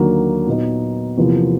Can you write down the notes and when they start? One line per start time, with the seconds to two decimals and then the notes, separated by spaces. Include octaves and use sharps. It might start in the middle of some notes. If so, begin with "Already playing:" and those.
Already playing: D#2 D3 F#3 A#3
0.47 A#2 F#3 B3 D#4
1.17 E2 C3 F3 A#3